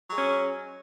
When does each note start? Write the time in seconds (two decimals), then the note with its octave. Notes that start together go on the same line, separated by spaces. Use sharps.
0.08 F#3
0.12 G#3
0.17 C#4